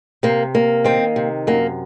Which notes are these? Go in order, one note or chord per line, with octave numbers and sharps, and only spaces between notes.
C3 A#3
A#3
D#3 C4
C3
F#2 A#3